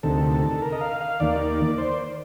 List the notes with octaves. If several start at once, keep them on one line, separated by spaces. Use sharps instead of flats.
D2 C3 D#3 A4
A#4
D#5
F5
F5
D#2 D#3 A#3 D5
C5